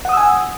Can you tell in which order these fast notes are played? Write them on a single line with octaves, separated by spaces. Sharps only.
F#5 D#6 E6 G#5